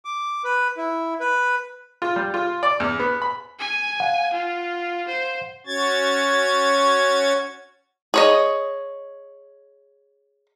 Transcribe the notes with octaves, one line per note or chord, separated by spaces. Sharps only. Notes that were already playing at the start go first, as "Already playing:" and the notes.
D6
B4
E4
B4
F4
G3
F4
D5
E2
B3
B5
G#5
F5 F#5
F4
C5
C#4 F#4 C#5 G#6 A6
G#4 C#5 D#5